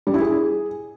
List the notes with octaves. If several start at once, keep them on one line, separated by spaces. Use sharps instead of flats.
G3
E4
G#4